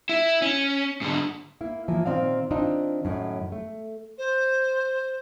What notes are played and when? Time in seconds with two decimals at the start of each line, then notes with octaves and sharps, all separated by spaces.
0.09 E4
0.42 C#4
1.02 G#2 D3
1.61 A#3 E4
1.88 E3 F3 A#3 F4
2.06 A#2 D#3 C4 D5 F5
2.51 D#3 C4 D4 D#4 F4
3.05 F#2 A2 D#3
3.52 A3
4.18 C5